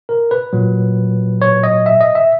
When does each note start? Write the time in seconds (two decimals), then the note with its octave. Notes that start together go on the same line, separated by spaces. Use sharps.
0.09 A#4
0.31 B4
0.53 A#2 F#3
1.42 C#5
1.63 D#5
1.86 E5
2.01 D#5
2.15 E5